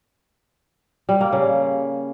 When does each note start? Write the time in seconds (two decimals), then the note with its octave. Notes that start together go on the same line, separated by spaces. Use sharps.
1.09 G3
1.21 A#3
1.32 C#3